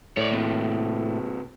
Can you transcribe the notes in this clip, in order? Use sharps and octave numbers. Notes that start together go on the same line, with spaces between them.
A2 C#5 D5
C3 A#3